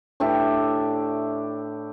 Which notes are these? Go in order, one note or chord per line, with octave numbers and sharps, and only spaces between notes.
A2 D4 G4 E5